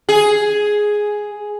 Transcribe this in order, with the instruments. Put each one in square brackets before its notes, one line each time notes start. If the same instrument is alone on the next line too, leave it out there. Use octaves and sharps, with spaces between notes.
[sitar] G#4